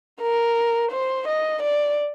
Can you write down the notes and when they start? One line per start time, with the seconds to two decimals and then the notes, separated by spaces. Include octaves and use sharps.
0.21 A#4
0.91 C5
1.28 D#5
1.63 D5